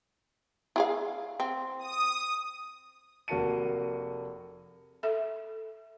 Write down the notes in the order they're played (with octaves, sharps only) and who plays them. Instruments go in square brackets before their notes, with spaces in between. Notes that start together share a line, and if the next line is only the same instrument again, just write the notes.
[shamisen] E4 G#4 F5
C4
[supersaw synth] D#6
[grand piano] F1 A#3 F#4 A5 C#7 D#7
[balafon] A4 E5